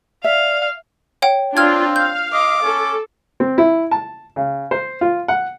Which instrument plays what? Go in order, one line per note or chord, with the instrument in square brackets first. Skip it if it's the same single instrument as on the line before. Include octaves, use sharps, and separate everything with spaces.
[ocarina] D5 [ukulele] E5 [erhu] F5
[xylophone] C#5 F#5 G5
[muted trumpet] C4 [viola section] D4 F4 [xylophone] F6 G#6
[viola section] F5 [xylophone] G6
[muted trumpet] D#5 [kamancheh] D6
[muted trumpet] C#4 [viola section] A4
[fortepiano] C4
E4
A5
C#3
C5
F4
F#5